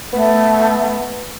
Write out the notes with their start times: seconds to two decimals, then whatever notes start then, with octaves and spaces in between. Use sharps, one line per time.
0.13 A3 B3